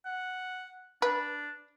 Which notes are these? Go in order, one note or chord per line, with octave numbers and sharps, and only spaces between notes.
F#5
D4 B4